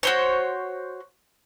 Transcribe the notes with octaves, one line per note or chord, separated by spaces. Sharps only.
F#4 C5 C#5